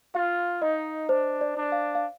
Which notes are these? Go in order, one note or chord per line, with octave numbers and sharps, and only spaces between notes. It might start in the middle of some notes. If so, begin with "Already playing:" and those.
F4 F5
D#4 D#5
D4 C5
D5
D4
F5
F5